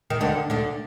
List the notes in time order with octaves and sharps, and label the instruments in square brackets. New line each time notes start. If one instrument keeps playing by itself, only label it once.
[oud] D#3
D2 D3
D2 D3